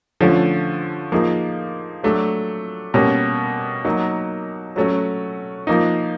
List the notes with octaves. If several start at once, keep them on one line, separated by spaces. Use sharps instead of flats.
D3 F3 A3 C#4
F3 A#3 D#4 G#4
F#3 A3 D4
B2 G3 A#3 C#4
F#3 A#3 D#4
F#3 A3 C#4 F#4
F3 A#3 D#4